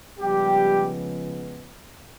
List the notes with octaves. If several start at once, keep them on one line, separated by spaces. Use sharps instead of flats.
C#3 F3 G3 G#3 B3 G4